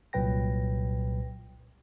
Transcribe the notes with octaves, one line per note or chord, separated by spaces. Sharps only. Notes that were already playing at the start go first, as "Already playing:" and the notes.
C2 A#2 F#3 B4 G5 A#6